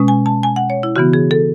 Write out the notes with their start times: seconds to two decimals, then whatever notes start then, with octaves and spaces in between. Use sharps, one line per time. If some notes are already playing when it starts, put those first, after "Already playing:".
Already playing: B2 G#3 C#4
0.08 G#5
0.26 A5
0.43 G#5
0.56 F#5
0.70 C#5
0.83 E4
0.96 C#3 E3 B3 F#4
1.13 G#4
1.31 A4